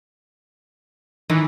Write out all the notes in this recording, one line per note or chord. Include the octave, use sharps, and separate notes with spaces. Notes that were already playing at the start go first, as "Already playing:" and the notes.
D#3 E3